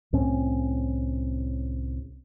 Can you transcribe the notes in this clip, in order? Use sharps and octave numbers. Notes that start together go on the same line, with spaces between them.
C2 A2 C4 C#4